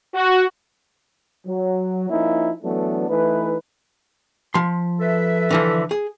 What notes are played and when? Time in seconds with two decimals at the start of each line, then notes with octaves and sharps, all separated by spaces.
0.15 F#4
1.46 F#3
2.09 F3 A#3 C#4 D#4 E4
2.62 E3 F#3 A3 B3 D4
3.09 E3 A3 D#4 B4
4.54 F3 C6
5.00 A4 B4 E5
5.51 D3 E3 F3
5.91 G#4